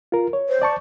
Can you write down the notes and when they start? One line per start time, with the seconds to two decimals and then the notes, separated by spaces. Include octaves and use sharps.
0.12 F4 A#4
0.33 C#5
0.49 C5
0.62 D5 A5 C#6